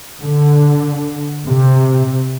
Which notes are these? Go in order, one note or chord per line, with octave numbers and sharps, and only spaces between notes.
D3
C3